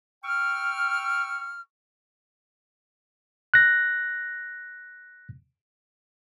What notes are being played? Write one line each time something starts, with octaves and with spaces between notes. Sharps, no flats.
G5 C#6 E6 F6
F#6 A#6